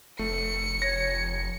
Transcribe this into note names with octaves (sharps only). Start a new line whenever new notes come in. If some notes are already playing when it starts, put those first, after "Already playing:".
F1 A3 C#7
C#5 A#6